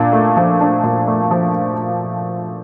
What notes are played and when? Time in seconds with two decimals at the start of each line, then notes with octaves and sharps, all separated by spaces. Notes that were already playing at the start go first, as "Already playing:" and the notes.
Already playing: A#2 D4
0.13 A3
0.36 F3
0.60 D4
0.83 A#2
1.07 A3
1.31 F3